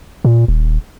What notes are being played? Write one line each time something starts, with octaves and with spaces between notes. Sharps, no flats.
A#2
D#1